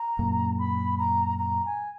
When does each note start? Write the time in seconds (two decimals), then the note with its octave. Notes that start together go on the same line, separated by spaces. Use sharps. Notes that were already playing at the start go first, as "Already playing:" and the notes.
Already playing: A#5
0.19 F#2 A#2
0.58 B5
0.98 A#5
1.38 A#5
1.65 G#5